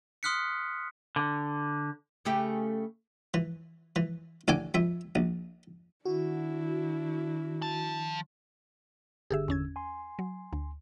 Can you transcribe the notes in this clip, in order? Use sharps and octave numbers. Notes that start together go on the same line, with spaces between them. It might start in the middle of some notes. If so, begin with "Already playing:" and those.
C6 D#6 F6 F#6 B6 C#7
D3
C#3 A3 G4
E3
E3
A1 D3 A4 G#5 D6
F2 E5
A#1
D#3 D4 E4 F#4
F3 A5
G1 D3 G4 G#4 E5 E6
E2 C#4 G#6
G#5 C6
F#3
D2